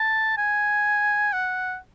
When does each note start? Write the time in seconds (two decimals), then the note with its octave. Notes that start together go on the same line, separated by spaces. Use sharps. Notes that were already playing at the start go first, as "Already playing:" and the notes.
Already playing: A5
0.38 G#5
1.33 F#5